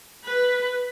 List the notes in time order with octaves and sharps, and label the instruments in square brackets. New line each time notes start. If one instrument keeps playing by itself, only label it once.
[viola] B4